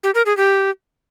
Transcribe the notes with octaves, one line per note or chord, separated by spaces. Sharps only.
G4
A#4
G#4
G4